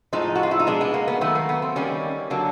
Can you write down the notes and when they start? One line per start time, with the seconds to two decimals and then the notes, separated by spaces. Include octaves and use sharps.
0.13 A2 F3 G#3 D#4
0.35 F#4
0.43 F4
0.51 E4
0.59 D#4
0.67 B2 G#3 D4
0.81 B3
0.94 A#3
1.08 B3
1.21 D#3 F#3 A3 B3
1.35 A#3
1.49 B3
1.62 C4
1.76 D#3 G3 A#3 C#4
2.30 D3 F#3 A#3 D4